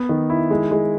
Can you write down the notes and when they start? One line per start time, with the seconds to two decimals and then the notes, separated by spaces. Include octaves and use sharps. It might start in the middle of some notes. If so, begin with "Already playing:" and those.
Already playing: B3
0.09 D#3
0.30 E4
0.51 G#3
0.71 G#3